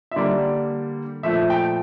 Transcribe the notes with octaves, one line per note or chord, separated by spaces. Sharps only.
E5
D3 G3 A#3 D5
A#2 F3 A3 E5
G5